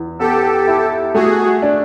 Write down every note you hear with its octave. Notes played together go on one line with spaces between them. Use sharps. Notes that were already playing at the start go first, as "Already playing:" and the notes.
Already playing: E2
B3 G4 A4
E4
A3 F#4 G#4
D4